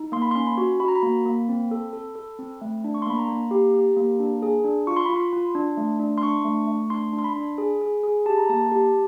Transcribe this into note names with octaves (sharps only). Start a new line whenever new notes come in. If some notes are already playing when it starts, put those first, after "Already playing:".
Already playing: D#4
A#3 C6
B5
C#4 C6
B5
F#4
F#4 B5
A#5
B5
A#3
A#3
C4
A4
A4
A4
C4
A3
D4
C#6
C6
A#3 B5
A#5
A#3
G4
G4
A#3
D4
G#4
D4
F4 C#6
C6
F4 B5
C6
F4
D4
A3
D4
C6
D4 C#6
A3
A3
D4 C6
D4
C6
B5
D4
G#4
G#4
G#4
G4 A5
A#5
A#3 A5
G4